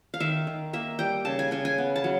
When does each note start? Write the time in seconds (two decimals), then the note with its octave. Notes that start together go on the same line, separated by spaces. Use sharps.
0.14 F5
0.20 D#3 E5
0.47 D#3
0.73 A#3 E5
0.99 G3 G5
1.25 C#3 A5
1.39 G#5
1.51 C#3 G#5
1.65 G#5
1.78 B3
1.96 A5
2.04 F#3